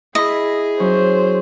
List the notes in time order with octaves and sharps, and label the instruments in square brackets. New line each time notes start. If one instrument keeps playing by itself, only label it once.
[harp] E4 B5 [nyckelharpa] G#4 [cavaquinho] D#5
[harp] F#3 C#4 [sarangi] C5